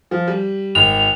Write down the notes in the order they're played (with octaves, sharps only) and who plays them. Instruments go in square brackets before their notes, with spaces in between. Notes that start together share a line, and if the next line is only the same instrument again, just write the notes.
[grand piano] F3
G3
[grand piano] G#1 [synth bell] F7